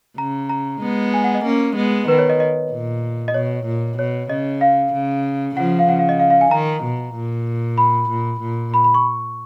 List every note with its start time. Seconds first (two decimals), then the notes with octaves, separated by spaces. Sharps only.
0.18 C#3 A#5
0.49 A#5
0.81 G#3 B3
1.14 G#5
1.24 F#5
1.35 D#5
1.45 A#3 C#4
1.76 G#3 B3
2.08 D#3 B4
2.19 C#5
2.30 D#5
2.40 D#5
2.72 A#2
3.28 D#5
3.34 B2 C#5
3.66 A#2
3.98 B2 C#5
4.30 C#3 D#5
4.61 F5
4.93 C#3
5.56 C#3 F3 F#5
5.79 F5
5.88 C#3 F#5
5.99 F5
6.09 D#5
6.20 F5
6.30 F5
6.41 G#5
6.51 D#3 A#5
6.84 B2
7.15 A#2
7.78 B5
8.10 A#2
8.41 A#2
8.74 B5
8.84 B5
8.94 C#6